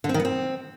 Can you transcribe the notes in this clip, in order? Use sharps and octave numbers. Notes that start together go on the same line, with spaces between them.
D3
C4
D#3
B3
C4